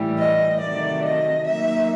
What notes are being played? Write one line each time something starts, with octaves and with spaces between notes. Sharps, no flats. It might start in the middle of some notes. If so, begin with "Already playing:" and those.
Already playing: A2 E3 G3
D#5
C3 D#3 F#3 A3 D5
D#5
F#3 A#3 D#4 E5